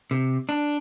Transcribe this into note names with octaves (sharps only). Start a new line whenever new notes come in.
C3
D4